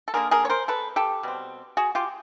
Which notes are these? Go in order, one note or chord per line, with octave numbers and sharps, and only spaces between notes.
A4
D3 F3 A#3 G#4 A#4
G#4 A#4
C#5
A#4 C5
A4 B4
G4 A4
B2 G3 C4
F#4 G#4
F4 G4